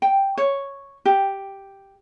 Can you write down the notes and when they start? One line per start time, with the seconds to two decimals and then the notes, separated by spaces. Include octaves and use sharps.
0.02 G5
0.38 C#5
1.05 G4